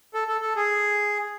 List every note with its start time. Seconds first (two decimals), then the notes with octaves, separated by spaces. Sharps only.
0.14 A4
0.28 A4
0.41 A4
0.56 G#4